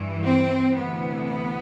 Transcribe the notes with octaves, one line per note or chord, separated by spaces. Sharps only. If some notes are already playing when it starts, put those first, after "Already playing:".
Already playing: G2 E3
C4
D2 C3 E3 B3